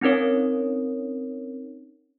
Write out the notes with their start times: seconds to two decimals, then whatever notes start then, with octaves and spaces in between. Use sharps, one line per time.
0.01 C4 C#4 D#4 A#4 C#5